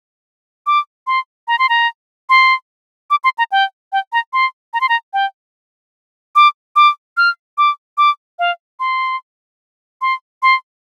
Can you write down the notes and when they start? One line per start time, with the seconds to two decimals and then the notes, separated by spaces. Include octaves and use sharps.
0.67 D6
1.07 C6
1.48 A#5
1.59 C6
1.69 A#5
2.29 C6
3.10 D6
3.24 C6
3.38 A#5
3.52 G5
3.93 G5
4.13 A#5
4.33 C6
4.74 A#5
4.81 C6
4.89 A#5
5.13 G5
6.36 D6
6.76 D6
7.17 F6
7.58 D6
7.98 D6
8.39 F5
8.80 C6
10.02 C6
10.43 C6